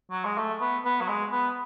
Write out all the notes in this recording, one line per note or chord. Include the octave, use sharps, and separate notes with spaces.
F#3
G#3
A3
B3
B3
F#3
G#3
B3